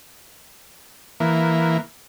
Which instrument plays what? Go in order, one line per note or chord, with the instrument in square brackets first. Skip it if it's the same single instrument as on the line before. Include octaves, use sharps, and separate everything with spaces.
[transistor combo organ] E3 A#3